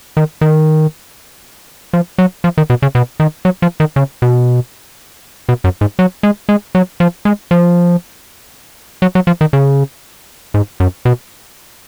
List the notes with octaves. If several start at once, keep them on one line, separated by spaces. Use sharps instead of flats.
D#3
D#3
F3
F#3
F3
D#3
B2
C#3
B2
D#3
F#3
F3
D#3
C#3
B2
B2
F#2
G#2
F#3
G#3
G#3
F#3
F3
G#3
F3
F#3
F#3
F3
D#3
C#3
G#2
F#2
B2